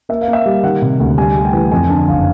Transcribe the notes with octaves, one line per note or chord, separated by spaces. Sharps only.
A#3 E5
F5
A#3
E5
G3
D#3 F#5
C3
D2
G3 G#5
G3
G5
E3
F2 G#5
D3 A5
F#1 F5